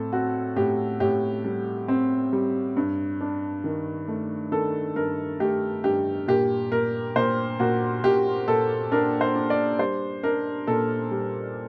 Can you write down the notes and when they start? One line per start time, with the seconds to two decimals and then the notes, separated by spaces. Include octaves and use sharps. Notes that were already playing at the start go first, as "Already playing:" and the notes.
Already playing: A2 C4 A4
0.12 C4 F#4
0.56 A2 G4
1.00 A2 G4
1.44 G3
1.88 C4
2.33 G3
2.77 G2
3.21 D4
3.64 D#3
4.08 A3
4.52 D#3 A4
4.96 G2 A#4
5.40 A3 G4
5.84 G2 G4
6.28 A#2 G4
6.71 A#2 A#4
7.16 A#2 C5
7.60 A#2 F#4
8.04 A#2 G4
8.47 A#2 A4
8.92 D4 A#4
9.21 C5
9.36 D4
9.50 D5
9.79 G3 C5
10.23 D4 A#4
10.67 A#2 A4
11.11 G3